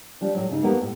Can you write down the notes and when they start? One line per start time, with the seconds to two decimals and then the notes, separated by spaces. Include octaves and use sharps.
0.21 F3 G3 D4
0.35 A2 F#3
0.51 C#3 D#4
0.63 F2 A#3 B3 G4 A#4
0.82 A2